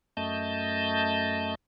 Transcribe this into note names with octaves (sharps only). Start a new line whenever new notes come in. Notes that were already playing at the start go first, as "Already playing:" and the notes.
F#2 A3 D#5 A5 G6